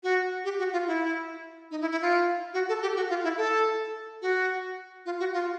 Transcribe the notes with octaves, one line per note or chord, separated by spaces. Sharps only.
F#4
G4
F#4
F4
E4
D#4
E4
E4
F4
F#4
A4
G4
F#4
F4
E4
A4
F#4
F4
F#4
F4